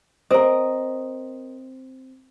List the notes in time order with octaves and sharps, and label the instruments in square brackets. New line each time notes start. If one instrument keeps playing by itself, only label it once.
[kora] C4 [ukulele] A#4 D#5